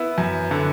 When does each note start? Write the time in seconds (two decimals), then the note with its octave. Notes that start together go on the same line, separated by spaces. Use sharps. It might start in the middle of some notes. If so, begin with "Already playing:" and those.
Already playing: B3 E4
0.18 F#2
0.51 D3